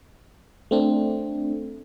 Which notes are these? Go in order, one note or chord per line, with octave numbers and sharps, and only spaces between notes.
A3 C4 D4